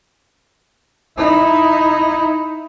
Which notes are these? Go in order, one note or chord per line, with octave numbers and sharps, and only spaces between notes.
D#4 E4